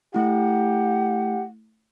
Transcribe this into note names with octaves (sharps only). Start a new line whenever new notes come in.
A3 E4 G4 F#5